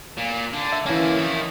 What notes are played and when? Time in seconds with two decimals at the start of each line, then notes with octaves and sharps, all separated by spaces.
0.17 A#2
0.53 D3
0.72 E5
0.86 E3 A#3 C#4 E4
1.18 D#3 E4